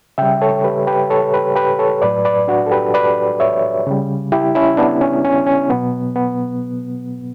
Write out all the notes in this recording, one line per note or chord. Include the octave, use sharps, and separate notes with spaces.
C#3 G3 E5 G5
A4 C#5
G4 B4
G4 B4
A4 C#5
G4 B4
G4 B4
A4 C#5
A2 F#3 B4 D5
B4 D5
D4 F#4
A4
G4 B4
B4 D5
C#5 E5
C#3 G3
E4 G4
C#4 E4
B3 D4
C#4
C#4
C#4
B2 F#3 B3
B3